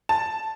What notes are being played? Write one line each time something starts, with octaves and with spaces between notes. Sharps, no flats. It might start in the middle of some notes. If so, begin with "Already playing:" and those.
A5